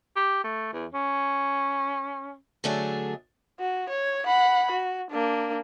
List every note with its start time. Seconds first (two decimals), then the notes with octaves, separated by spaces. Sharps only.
0.17 G4
0.44 A3
0.73 E2
0.94 C#4
2.64 D3 F#3 A3 D4 G#4
3.60 F#4
3.89 C#5
4.26 F#5 B5
4.71 F#4
5.10 A#3 D4